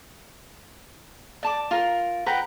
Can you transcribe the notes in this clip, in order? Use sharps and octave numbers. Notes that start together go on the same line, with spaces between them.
D5 A5 D6
F4 A#4
B4 F#5 G5 A#5